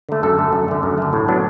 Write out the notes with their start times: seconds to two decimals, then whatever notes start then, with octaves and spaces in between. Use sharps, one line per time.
0.09 D3 A3
0.23 F#2 A4
0.38 D3 A3
0.53 F#2
0.68 D3 A3
0.83 F#2
0.98 D3 A3
1.13 A2
1.28 F#3 B3 D4